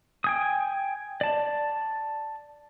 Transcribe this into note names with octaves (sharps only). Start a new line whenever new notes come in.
G5 G#5 D#6
D5 A5